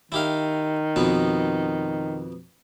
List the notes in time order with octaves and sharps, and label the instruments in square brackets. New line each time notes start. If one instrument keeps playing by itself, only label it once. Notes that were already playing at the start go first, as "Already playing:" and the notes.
[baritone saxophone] D#3 [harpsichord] E4 G4 F5
[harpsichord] F2 B2 B3